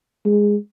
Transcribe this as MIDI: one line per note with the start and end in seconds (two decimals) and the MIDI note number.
0.25 0.56 56